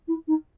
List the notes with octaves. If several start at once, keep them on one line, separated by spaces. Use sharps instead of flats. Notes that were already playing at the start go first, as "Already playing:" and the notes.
E4
D#4